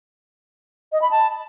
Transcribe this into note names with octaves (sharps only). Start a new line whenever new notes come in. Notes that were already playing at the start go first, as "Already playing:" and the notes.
D#5
B5
A5